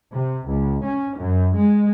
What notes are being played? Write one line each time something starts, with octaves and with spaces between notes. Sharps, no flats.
C3
C#2
C#4
F#2
G#3